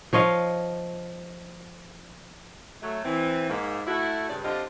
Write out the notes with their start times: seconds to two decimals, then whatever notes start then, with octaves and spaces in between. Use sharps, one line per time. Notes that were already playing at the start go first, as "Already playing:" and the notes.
0.13 F3 C#5 D#5 F5
2.82 F#3 A3
3.05 E3 C4
3.49 G#2 A#3
3.87 A3 E4 F#4
4.29 G2 C#3 D5
4.44 D3 F3 C4 F4 G4 D#5